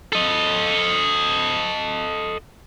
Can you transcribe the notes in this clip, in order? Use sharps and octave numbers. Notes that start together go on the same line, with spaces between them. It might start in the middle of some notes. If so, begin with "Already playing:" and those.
A4 D#5